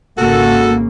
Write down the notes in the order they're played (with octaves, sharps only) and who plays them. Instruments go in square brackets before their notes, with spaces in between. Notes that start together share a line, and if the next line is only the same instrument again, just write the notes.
[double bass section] G#1 C#3 A#3 [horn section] F#4 A4